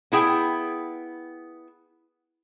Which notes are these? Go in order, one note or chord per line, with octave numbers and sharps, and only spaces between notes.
B3 E4 G#4 G5